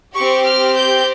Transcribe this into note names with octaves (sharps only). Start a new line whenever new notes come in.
C4 G4 C#6
F6
G6